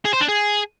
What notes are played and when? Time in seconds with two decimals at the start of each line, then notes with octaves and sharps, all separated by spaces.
0.05 G#4
0.13 C5
0.21 D4
0.28 G#4